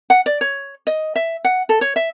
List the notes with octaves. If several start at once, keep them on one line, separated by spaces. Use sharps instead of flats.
F#5
D5
C#5
D#5
E5
F#5
A4
C#5
E5